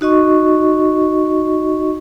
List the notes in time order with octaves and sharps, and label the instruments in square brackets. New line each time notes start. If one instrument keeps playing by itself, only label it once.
[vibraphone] D#4 F#4 D#5 C#6